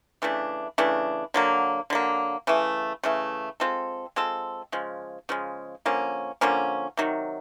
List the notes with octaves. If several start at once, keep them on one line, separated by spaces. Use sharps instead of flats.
C#3 E3 A3 D4
C#3 E3 A3 D4
D3 F#3 A#3
D3 F#3 A#3
C#3 E3 A3
C#3 E3 A3
G#3 C4 F4 A4
G#3 C4 F4 A4
C#3 F3 G#3
C#3 F3 G#3
D3 F3 A#3 C#4
D3 F3 A#3 C#4
C3 D#3 F#3